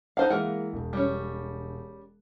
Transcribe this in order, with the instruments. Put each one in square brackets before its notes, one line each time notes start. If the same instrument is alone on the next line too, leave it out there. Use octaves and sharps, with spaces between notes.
[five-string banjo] D#4 C5 F5 [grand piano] F#5 A5
[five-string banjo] E3 A#4 F#5 [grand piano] G#3 A#3
[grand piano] E1
[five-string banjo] G3 C#4